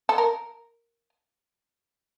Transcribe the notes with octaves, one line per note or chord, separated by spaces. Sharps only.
A4
A#4